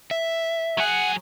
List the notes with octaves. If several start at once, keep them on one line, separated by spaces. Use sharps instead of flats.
E5
F#3 G#4 F#5